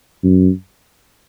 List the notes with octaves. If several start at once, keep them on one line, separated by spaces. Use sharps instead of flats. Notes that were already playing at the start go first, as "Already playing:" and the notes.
F#2